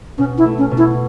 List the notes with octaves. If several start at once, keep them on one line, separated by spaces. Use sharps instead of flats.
B2 C#4
E4
A3
C#4
B2
E4